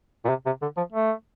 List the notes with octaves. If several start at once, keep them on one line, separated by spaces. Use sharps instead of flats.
A#2
C3
C3
D3
F3
A3